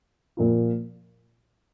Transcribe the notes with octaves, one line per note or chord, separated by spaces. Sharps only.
A#2 F3 A#3 F4